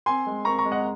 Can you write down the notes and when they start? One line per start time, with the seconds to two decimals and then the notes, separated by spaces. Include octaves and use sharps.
0.06 C4 G#5 C6
0.26 G#3
0.45 C4 A#5 C#6
0.59 A#5 C#6
0.65 G#3
0.72 D#5 F#5